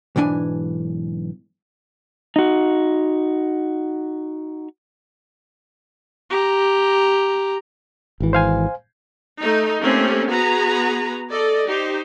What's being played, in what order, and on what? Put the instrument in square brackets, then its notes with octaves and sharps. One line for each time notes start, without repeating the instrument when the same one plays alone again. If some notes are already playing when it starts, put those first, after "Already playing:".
[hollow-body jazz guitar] B1 G#2 E3 D4 G#5
[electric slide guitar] D#4 F#4
[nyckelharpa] G4 A#5
[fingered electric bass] G#1 E3
[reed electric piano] C5 F5 G#5
[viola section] A3 D#4
A3 A#3 C4 C#4 G4
B3 F#4 G#4 B4 A#5
A4 D5 D#5
D#4 G4 C5